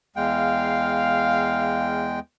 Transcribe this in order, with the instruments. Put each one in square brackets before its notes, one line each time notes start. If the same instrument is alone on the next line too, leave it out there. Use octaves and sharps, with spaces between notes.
[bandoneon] E2 G#3 G5 [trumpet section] F5